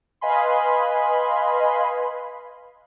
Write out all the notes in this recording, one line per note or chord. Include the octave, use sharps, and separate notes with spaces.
B4 D#5 F5 G#5 B5 C6